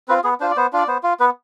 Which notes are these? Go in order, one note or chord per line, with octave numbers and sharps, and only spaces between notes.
C4 F4 B4
B3 G#4
D4 F4 C5
D5
B3 C5
D4 F4 D5
B3 C5
F4
B3 B4